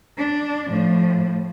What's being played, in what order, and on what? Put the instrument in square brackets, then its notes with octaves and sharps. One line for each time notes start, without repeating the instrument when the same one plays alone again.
[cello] D4
A2 F3